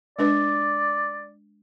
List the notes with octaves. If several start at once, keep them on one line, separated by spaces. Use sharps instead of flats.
G#3 D4 B4 D5